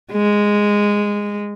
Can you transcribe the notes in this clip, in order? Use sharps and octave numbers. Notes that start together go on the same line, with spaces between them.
G#3